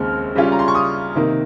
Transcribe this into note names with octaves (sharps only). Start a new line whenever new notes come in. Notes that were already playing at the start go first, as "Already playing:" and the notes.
Already playing: D#2 C#3 G#3 C4 F6
C#3 G3 C#4 F4
A#5
C6
C#6
D#6
C3 D#3 A#3